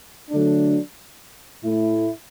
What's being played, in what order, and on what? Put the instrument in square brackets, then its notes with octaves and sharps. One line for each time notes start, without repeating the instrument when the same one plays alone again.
[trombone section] D3 F#3 A3 D4
A2 A3 E4